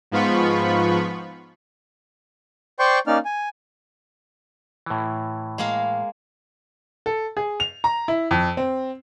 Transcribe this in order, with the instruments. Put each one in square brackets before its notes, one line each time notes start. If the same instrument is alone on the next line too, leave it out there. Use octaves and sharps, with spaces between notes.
[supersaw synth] G#2 F3 B3 F4 B5 C#6
[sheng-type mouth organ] C5 D5 G5 C6 C#6 G6
A#3 C#4 D#4 D5 F6
G#5
[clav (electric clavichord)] A2 E3
[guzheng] G#3 A#3 F5
[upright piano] A4
G#4
F7
A#5
E4
F2
C4